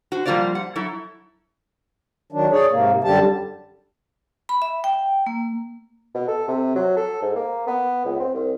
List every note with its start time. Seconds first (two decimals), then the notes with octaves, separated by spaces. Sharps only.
0.12 F#4 C5
0.26 F3 G3 A#3 F4 C5 D5
0.55 F#5
0.76 F#3 E4 A4
2.32 D#3 F#3 D4
2.52 G#4 C#5 D5
2.72 G#2 C3 A#3
3.04 F#2 D3 G3 G4 A5
4.49 B5
4.62 E5
4.84 G5
5.26 A#3
6.15 B2
6.28 A4
6.48 C3
6.76 F#3
6.97 A4
7.22 G#2
7.36 A#3
7.67 B3
8.05 C#2
8.20 C4
8.34 C2